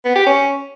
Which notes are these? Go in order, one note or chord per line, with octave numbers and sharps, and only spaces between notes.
B3
G4
C#4